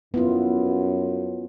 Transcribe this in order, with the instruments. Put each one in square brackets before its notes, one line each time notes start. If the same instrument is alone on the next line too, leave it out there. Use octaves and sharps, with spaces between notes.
[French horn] F#2 [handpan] B3 E4 F4